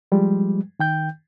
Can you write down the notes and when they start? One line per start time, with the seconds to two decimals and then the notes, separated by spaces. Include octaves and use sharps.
0.12 F3 G3 G#3
0.80 D#3 G5 G6